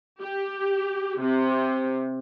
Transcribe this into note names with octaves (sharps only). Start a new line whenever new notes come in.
G4
C3